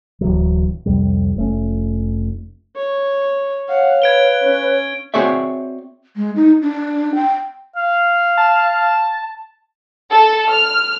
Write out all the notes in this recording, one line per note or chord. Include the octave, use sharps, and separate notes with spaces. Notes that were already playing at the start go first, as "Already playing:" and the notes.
D1 D2 E3 F#3
C2 F2 C3 G3
F1 A3 C#4
C#5
C#5 F5 F#5
B4 G#6 D7 G7
C#4
C4 F#4 G#4 C#5 D5 E5
G#3
D#4
D4
G5
F5
A5
A4
F6